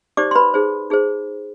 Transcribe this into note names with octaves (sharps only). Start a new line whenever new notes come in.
D#4 G4 C5 D5 D6
C6
B4 B5
D#4 G#4 C5
D#4 G#4 C5